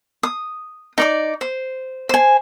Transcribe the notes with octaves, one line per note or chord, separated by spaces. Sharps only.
D#6
D#4 D5 D6
C5
C5 G#5